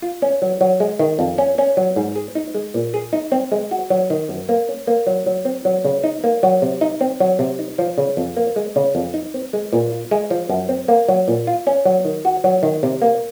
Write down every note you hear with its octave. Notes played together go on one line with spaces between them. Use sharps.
F4
C#4
F#3
F#3
G#3
D#3
F2
C#4
C#4
F#3
G#2
G#4
D#4
G#3
A#2
G#4
D#4
C4
G#3
F#4
F#3
D#3
F#2
A#3
C#4
A#3
F#3
F#3
C4
F#3
C#3
D#4
A#3
F#3
C3
D#4
C4
F#3
C3
D#4
F3
C#3
F2
A#3
G#3
C#3
F2
D#4
C4
G#3
A#2
F4
G#3
F3
F#2
C4
A#3
F#3
A#2
F4
C#4
F#3
D#3
F#4
F#3
D#3
C3
A#3